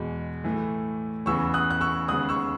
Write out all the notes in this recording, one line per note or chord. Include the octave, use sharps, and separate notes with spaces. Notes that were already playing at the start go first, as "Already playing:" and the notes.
Already playing: E2 B2 G#3
A2 E3 A3
E2 C#3 E3 B3 C#6 E6
D#6 F#6
F#6
C#6 E6
D#2 C#3 G#3 B3 D#6 F#6
C#6 E6